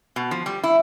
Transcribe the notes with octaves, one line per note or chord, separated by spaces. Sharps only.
B2
F3
G3
E4